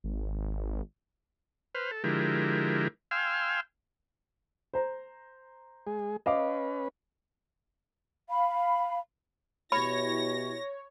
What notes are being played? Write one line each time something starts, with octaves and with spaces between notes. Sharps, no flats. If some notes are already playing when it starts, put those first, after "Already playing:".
G#1
B4 C5 F6
A4
D3 F3 G#3 E4 G4 A#4
F5 G5 G#5 C6 E6 F6
C5 A#5
G#3 G#4
C#4 B4 D#5 F5 D6
F5 B5
B2 E4 G4 C#5 B5 A#6